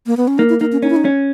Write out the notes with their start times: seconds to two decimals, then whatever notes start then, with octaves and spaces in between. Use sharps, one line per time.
0.07 A#3
0.17 B3
0.28 C#4
0.38 A#3 D#4
0.49 E4
0.60 A#3 D#4
0.72 C#4
0.82 C#4 D#4
0.90 E4
0.96 D#4
1.05 C#4